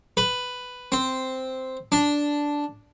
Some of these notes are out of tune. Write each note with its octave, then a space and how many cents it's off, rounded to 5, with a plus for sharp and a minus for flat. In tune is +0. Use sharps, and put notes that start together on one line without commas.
B4 +5
C4 -5
D4 -5